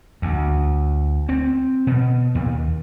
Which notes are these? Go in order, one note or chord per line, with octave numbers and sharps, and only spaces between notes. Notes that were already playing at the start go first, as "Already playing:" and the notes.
D2
C4
B2
D#2